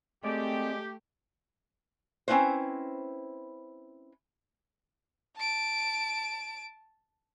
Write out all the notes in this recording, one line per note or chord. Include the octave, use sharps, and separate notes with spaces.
G#3 A3 C4 G4 D5
C4 C#4 D#4 E4 B4 C5
A5 D7